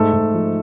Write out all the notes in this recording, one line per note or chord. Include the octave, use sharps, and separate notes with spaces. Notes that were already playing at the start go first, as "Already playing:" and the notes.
Already playing: G#2 A3 A4
G#2
F3